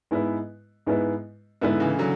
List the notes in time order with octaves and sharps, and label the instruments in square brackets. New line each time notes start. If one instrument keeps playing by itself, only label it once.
[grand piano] G#2 G#3 B3 E4 B4
G#2 G#3 B3 E4 B4
[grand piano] G#2 G#3 B3 E4 B4 [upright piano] D3
[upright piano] C#3 E3
D3 F#3